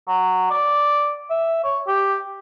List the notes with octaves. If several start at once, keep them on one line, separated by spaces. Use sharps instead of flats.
F#3
D5
E5
C#5
G4